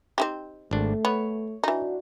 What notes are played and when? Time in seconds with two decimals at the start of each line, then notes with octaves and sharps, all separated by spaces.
0.18 C4 D#4 G4
0.71 G#1 A3 D4
1.05 B3 C#5
1.64 E3 D4 D#4 F#4